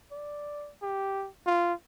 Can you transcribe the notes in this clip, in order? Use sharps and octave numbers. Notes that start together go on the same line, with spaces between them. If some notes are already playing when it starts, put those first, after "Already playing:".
D5
G4
F4